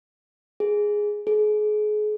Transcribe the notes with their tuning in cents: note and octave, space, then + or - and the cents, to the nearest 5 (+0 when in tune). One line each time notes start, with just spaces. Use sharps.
G#4 +0
G#4 +35